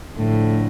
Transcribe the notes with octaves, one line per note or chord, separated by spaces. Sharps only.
A2 D3 F3 A3